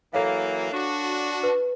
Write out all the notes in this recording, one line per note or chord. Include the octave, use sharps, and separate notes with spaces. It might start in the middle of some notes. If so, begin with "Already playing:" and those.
E3 F#3 A#3 A4 C#5 F5
D4 F#4
B4